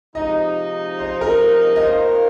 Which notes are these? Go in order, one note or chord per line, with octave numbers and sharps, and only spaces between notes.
C3 F3 G#3 D#4 D#5
C5
A#4
D#5
D#3 A#3 F4 A#4 C5